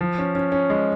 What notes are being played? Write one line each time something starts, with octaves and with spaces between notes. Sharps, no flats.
F3
C#4
C#4
C#4
G#3